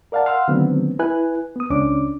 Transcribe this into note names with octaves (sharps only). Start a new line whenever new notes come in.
A#4 D5 F5 F#5 A5
F5 F#5 C6 E6 F6
D3 D#3 F#3 A3 B3 C4
E4 B4 G#5 F#6
B3 D#6
C#2 C#4 D4 D6